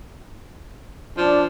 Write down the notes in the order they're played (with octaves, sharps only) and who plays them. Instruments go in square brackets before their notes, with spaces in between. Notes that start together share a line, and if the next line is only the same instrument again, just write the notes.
[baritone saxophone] F3 [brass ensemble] D4